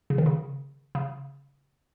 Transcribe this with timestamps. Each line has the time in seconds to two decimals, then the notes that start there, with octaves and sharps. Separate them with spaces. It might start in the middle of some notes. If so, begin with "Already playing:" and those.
0.10 C#3
0.18 D#3
0.26 C#3
0.95 C#3